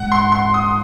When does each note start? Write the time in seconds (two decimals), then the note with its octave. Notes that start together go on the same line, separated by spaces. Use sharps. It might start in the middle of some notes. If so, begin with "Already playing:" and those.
Already playing: G#2 F#5
0.12 C6
0.32 C6
0.54 D#6